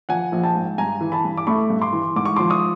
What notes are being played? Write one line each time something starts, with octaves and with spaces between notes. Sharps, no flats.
F3 F#5 G#5
A#1
G5 A5
G#2
G2 G#5 A#5
E3
A5 B5
G2
D6
A3 B5 C#6
G2
C6 D6
E3
G#2 D6
C#6
F3 C6 D6
C#6 D#6